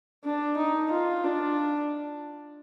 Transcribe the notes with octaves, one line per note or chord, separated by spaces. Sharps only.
D4
D#4
F4
D4